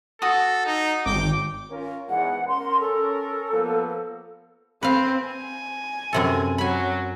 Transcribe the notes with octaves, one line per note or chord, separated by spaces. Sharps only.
F#4 A4 D#6
D#4
G#1 G5 D6 G6
C#4 F4 A#4
E2 G#2 F#5
C#4 A#4 C6
A4
F3 A#3 B3
C4 B4 F5
G#5
F#2 C3 A4
F#3 G#5 B5